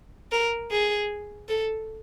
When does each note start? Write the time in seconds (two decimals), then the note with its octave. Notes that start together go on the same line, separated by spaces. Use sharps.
0.32 A#4
0.71 G#4
1.48 A4